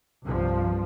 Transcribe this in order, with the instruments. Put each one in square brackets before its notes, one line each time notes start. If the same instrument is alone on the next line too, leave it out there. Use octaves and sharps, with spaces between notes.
[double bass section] C2 G2 F3